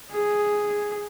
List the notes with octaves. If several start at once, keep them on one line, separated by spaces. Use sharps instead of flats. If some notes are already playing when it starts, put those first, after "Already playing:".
G#4